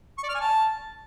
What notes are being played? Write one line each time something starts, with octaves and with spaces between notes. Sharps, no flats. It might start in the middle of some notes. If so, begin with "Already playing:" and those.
C#6
D5
F6
G#5
A5